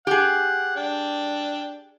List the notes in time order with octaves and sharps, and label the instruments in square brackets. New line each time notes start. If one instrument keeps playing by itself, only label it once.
[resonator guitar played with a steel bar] G4 G#4 [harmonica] F#5
[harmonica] D4 G5